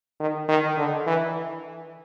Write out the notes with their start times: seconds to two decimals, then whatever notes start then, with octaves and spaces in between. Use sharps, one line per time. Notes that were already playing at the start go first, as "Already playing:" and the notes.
0.20 D#3
0.49 D#3
0.77 D3
1.07 E3